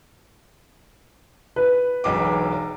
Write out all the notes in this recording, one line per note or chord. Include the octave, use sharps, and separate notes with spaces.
B4
E1 B1 D6